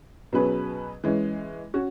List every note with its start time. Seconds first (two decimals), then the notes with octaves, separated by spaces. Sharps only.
0.33 B2 F#3 C#4 G#4 B4
1.04 E3 G#3 C#4
1.74 C#4 F#4